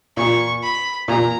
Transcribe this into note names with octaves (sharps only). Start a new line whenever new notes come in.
A#2 C#6
B5
A#2 A#5